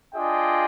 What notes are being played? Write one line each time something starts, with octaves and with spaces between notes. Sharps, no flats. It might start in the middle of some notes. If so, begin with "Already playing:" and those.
D4 F4 G#4 D#5 G5